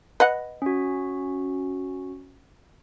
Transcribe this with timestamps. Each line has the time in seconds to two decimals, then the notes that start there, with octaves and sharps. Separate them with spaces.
0.20 B4 D#5 F#5
0.62 C#4 F#4